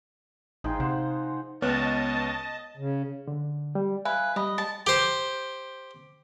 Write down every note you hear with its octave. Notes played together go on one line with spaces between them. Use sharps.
A1 F3 G#3 D#4 G#4 G5
C3 C5 F#5
C#2 B3 C#5 D#5 A5 F6
C#3
D3
G3
B4 E5 F5 G#5
G3 D#5 B5
A5
G4 C5